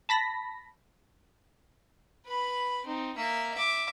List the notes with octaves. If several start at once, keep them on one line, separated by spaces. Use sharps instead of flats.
A5 B5 A#6 B6
B4 B5
C4 D#4
A#3 E5
E5 D6